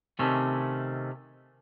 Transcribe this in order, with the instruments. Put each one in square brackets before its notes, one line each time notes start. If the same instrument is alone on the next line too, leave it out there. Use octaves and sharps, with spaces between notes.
[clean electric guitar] C3 D#3 A3 C#4